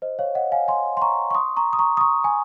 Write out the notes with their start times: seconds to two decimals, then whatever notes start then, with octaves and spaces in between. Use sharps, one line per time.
0.02 C5 D#5
0.19 C#5 F5
0.35 D#5 F#5
0.52 F5 G#5
0.68 G#5 C6
0.97 C6
1.02 A#5 C#6
1.30 C#6
1.35 C6 D#6
1.56 A#5 C#6
1.73 D#6
1.79 A#5 C#6
1.97 D#6
2.01 A#5 C#6
2.24 G#5